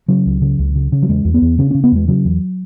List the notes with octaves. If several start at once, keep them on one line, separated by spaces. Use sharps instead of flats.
C#3 F#3
C#2
C#3
C#2
C#3
C#3
F#3
E2 G#3
E2
B3
E2
C#3 C#4
C#3 C#4
B3
E2 G#3
C#3 F#3
E2